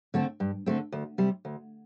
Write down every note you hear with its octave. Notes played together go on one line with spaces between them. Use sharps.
D3 A3 C4
G2
D3 A3 C4
D2
C3 G3
D2